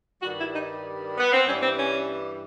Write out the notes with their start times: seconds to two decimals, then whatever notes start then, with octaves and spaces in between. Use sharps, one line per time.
0.21 G2 D#3 G3 F#4
0.37 E4
0.53 D#4
1.18 B3
1.33 C4
1.46 G2 E3 G3 C#4
1.62 C4
1.77 C#4